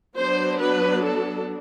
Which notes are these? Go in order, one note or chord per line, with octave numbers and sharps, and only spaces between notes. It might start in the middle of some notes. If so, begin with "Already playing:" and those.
F#3 B3 D4 C5
B4
A4